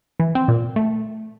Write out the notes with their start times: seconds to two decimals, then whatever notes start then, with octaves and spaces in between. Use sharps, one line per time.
0.20 E3
0.35 C4
0.48 A#2
0.76 A3